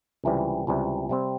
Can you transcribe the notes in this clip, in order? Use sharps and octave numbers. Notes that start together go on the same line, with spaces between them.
C#2 C3 E3 G3
C#2 C3 E3 G3
C3 G3 C4